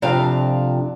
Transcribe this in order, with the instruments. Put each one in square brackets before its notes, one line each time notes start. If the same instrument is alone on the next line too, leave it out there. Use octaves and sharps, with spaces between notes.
[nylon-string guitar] F2 C3 D4 F4 G4 F5